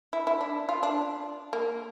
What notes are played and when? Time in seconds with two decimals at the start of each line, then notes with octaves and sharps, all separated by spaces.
0.13 E4
0.27 E4
0.41 D4
0.69 F4
0.83 D4
1.53 A#3